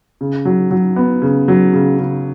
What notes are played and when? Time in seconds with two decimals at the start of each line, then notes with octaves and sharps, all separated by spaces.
0.21 C#3
0.45 F#3
0.71 F#3
0.96 B3
1.22 C#3
1.48 F#3
1.73 C#3
1.99 C#3